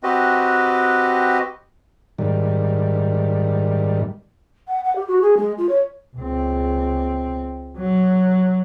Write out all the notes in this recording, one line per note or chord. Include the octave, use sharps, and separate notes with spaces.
C4 F#4 G4 B4 D#5
G#2 D#3 G3
F#5
F#5
G4
F#4
G#4
G#3
F4
C#5
C#2 C4
F#3